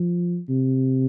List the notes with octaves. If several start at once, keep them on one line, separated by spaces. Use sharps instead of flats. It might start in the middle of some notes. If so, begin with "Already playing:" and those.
Already playing: F3
C3